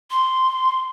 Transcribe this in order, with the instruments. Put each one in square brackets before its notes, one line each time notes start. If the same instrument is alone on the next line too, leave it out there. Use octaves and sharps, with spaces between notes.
[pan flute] C6